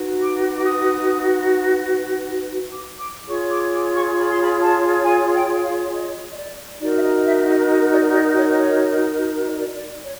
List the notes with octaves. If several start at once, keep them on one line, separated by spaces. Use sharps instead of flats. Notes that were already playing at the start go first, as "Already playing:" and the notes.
Already playing: D#4 F#4 B4
D6
D6
D#6
D6
D6
F4 G#4 C#5 C#6
D6
D6
C#6
B5
C6
B5
A5
G#5
G5
F5
D#5
D#5
D5
D#4 F#4 A#4 D5
E5
D#5
E5
D#5
D#5
D5
D5
C#5
C#5
D5
D#5
D5
D5
C#5